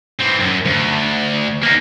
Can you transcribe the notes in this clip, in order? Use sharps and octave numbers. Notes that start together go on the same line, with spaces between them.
E3 C4
F#2
D2
A#3 D#4